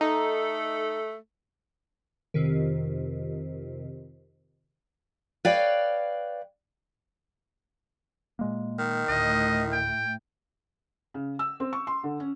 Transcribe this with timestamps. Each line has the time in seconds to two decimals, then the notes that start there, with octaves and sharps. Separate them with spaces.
0.01 A3 D#4 A4
2.34 F2 C3 D#3
5.45 B4 C#5 D5 F5 G5
8.39 A#2 G#3 A#3
8.79 D#3
9.09 D2 A2 D#5
9.72 G5
11.14 C#3
11.39 E6
11.60 C4
11.73 C#6
11.87 C6
12.03 D3
12.20 C#4